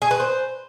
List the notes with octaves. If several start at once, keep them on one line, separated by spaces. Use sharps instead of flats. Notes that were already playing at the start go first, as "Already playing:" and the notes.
G#4
B4
C5